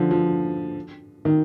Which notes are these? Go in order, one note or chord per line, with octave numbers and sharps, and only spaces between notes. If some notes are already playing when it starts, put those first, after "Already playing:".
Already playing: D3 F3
F3
D#3